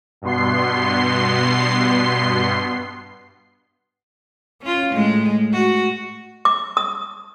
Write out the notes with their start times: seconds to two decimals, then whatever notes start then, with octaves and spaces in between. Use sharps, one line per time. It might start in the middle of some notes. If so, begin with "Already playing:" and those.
0.22 G2 B2 B3 C6 C7
4.62 C#4 F4
4.93 A2 G#3
5.53 F#4
6.45 D6
6.77 D#6